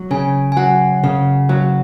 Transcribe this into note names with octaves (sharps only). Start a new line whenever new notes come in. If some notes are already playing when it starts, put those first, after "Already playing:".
Already playing: F#3
C#3 G#5
G#5
F#3 F#5
C#3
F#3